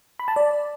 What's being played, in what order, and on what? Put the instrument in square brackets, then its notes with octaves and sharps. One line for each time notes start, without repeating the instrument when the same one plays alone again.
[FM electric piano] B5
A5
D5